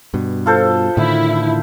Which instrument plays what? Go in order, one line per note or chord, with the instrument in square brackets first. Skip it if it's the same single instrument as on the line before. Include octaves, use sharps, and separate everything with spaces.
[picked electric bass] G2 B2
[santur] F4 A4 C5
[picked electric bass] A2 D3 D#3 [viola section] E4